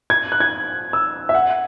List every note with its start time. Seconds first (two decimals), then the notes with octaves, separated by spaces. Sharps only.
0.10 G#6
0.32 F#6
0.40 G#6
0.93 E6
1.29 E5
1.34 F#5